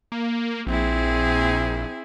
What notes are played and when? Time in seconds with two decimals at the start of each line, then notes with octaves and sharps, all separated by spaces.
0.12 A#3
0.67 A#1 C4 E4 G#4